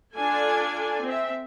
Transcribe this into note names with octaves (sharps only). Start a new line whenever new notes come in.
D4 F4 A4 D5 G#5
C4 E5